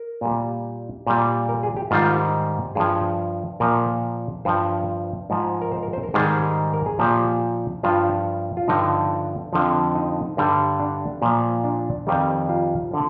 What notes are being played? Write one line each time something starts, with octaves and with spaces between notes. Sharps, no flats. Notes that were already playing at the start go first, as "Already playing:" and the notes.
Already playing: A#4
A#2 G3
A#2 G3
A#4
G#4
G4
G#2 D#3 G3 F4
G2 F3 G#4
A#2 F3 A#4
G2 F3 C5
G#2 F3
A#4
C5
A#4
C5
A#4
G#2 D#3 G3 G#4
A#4
G#4
A#2 F3 G4
G2 F3 F4
F4
G2 D3 F3 D#4
F2 D3 F3
D#4
G2 D3 G3
D4
A#2 F3
D4
F2 D#3 G3
F4
D3 F3